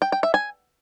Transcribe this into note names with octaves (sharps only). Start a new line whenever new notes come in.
G5
G5
E5
G#5